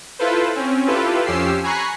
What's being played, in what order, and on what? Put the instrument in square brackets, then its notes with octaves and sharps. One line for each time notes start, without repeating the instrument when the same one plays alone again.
[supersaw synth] E4 F4 A4 B4 C5
C4 C#4
E4 F4 G4 A4 B4
F2 F3 C#4 G4 E6 C7
G#5 A#5 B5 C#6 F#6 C7